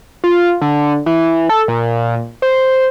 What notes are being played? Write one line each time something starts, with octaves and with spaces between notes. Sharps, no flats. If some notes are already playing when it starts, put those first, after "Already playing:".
F4
D3
E3
A4
A#2
C5